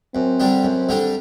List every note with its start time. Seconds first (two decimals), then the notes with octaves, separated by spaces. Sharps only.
0.15 F#2 C4
0.40 D3 G3 D4 G4
0.63 F#2
0.89 D3 G3 D4 G4